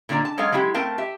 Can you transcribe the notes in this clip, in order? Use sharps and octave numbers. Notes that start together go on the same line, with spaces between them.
A#2 D3 A#3 D5 A#5
A5
F#3 G#3 A4 C#5 F5
F#3 G#3 E4 F#4 G4
A3 C4 A#4 F5 A5
G4 E5